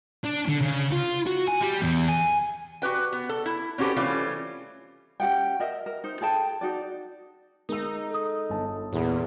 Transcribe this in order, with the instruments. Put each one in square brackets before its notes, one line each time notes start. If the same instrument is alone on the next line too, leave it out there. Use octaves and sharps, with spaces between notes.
[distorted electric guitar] D4
D3
C#3
F4
F#4
G#5
G3
E2
G#5
[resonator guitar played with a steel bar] F#4 G4 B4 G5
B3
A4
E4
C4 C#4 F#4 G4 A4 B4
E3 G3 A3 C4 C#4 F4
[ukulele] C#4 G4 F#5 G5
A#4 D#5 E5
A#4
D#4 C5
G#4 A4 G5 A5
D#4 F#4 D5
[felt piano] G#3 E6 [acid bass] D#4 [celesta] A#4
[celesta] A4 D#6
[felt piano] G1 A5
[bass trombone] E2 [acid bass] A#2